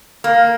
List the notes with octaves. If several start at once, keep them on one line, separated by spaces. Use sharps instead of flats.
A#3